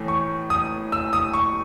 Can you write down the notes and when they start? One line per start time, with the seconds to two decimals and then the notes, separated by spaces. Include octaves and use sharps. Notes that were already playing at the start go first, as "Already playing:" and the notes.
Already playing: A2 E3 A3
0.08 C#6
0.50 D#6
0.92 E6
1.13 D#6
1.33 C#6